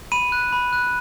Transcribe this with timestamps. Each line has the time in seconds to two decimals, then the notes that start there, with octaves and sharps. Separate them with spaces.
0.12 B5 D#7
0.32 F#6
0.53 B5
0.73 F#6